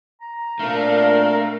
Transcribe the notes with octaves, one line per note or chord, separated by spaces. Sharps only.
A#5
A#2 A3 C4 D4 A#4 F5